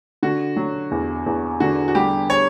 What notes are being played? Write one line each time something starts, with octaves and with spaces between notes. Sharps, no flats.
D3 F#4
F#3
E2
E2
D3 F#4
F#4
G3 G4
C#5